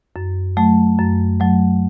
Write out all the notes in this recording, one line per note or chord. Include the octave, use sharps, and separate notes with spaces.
F#2
F#3 A3
F#2
F#3 A3